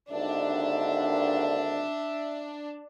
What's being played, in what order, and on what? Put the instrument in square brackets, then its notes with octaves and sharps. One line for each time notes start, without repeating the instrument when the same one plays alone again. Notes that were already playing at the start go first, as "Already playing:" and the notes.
[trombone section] G#1 D#2 D3 [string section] D4 [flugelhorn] E5